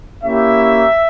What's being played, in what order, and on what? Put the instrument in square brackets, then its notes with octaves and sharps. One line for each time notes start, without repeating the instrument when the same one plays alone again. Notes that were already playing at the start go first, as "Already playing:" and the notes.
[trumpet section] A#3 C#4 E4 G4 E5